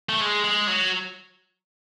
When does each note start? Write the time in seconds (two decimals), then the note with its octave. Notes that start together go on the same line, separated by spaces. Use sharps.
0.09 A3
0.21 G#3
0.44 G#3
0.67 F#3